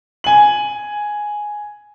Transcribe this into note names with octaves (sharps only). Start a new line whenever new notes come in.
G#5 F#7